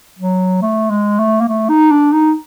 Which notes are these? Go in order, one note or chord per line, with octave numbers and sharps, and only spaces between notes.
F#3
A3
G#3
A3
A#3
A3
D#4
D4
D#4